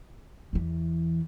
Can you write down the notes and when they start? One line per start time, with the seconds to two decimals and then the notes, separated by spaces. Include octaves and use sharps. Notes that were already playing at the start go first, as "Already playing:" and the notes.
0.53 E2 E3